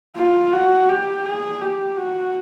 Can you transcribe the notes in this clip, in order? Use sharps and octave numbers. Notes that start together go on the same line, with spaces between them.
F4
F#4
G4
G#4
G4
F#4